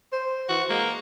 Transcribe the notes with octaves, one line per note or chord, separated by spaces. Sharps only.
C5
E3 F#4
G#3 A#3